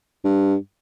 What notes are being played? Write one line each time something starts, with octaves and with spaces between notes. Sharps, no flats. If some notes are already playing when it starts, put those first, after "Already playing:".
G2